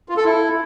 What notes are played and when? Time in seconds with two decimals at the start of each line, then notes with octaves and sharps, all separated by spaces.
0.09 F4
0.17 A4
0.25 E4